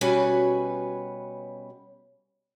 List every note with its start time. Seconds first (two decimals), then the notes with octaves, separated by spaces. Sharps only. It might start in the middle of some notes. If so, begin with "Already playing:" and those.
0.01 B2 G3 C#4 F#4 B4 G#5